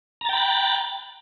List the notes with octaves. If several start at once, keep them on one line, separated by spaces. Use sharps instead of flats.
G5 A#5 B5 F#6 A6